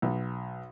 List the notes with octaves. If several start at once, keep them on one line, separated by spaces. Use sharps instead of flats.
B1